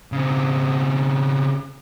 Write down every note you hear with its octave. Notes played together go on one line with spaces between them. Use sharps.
C#3 C4